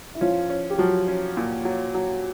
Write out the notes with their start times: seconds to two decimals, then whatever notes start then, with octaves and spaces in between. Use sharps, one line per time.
0.15 E4
0.21 F3 C#4 F4
0.50 C#4
0.70 G4
0.78 F3 F#3 F#4
1.08 C#4
1.37 A#2
1.65 F#3
1.94 F#3